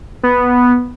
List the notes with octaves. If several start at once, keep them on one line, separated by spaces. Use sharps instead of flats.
B3